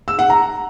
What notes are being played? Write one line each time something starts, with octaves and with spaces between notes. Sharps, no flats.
E6
F#5
A#5